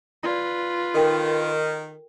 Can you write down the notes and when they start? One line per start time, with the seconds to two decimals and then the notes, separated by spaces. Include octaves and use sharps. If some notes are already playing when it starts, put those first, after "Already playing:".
0.23 F4 B4 D5 A#5
0.94 D#3 A4 A#4 G5